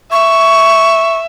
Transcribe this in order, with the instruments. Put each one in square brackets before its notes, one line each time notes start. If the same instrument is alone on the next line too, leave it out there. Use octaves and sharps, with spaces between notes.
[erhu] E5 [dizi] C#6